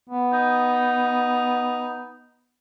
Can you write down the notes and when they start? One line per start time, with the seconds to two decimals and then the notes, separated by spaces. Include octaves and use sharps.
0.09 B3
0.33 D#4